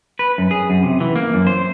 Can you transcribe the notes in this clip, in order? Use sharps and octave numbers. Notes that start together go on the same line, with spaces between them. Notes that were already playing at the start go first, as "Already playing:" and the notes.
B4
F#2
G#4
F#2
C3
E3
A#3
F#2
C5